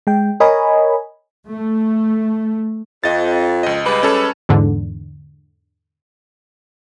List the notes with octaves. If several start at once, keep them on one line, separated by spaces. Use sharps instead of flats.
G#3 G5
A#4 C#5 D#5 G#5 B5
A3
F2 D#5 A6
C#2 D#5
G3 G#3 B4
C#4 A4 C#5
E2 G#2 D3